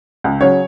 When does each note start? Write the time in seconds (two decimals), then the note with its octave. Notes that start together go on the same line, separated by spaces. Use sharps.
0.24 C#2
0.41 C#3 F#3 C#5